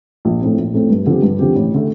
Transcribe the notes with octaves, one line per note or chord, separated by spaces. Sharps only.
A#1
A2 A3 C4
A#1
A2 A3 C4
G2
D3 F3 C4 G4
G2
D3 F3 C4 G4
A1
D3 A3